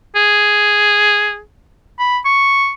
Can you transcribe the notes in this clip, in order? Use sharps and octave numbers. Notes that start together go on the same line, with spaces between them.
G#4
B5
C#6